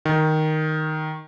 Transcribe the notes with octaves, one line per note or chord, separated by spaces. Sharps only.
D#3